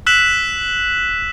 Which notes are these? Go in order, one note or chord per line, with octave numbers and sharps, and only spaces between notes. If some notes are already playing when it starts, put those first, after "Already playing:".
E6 F#6 B6 E7 F#7